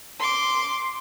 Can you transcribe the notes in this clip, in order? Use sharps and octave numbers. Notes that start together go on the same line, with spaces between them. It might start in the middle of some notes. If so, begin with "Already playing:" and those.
C6 D6